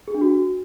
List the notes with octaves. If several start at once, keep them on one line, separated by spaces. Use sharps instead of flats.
G#4
D4
F#4